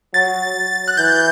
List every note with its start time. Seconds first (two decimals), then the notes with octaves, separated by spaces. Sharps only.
0.14 F#3 A6
0.56 F#3
0.88 F#6
0.97 E3 G6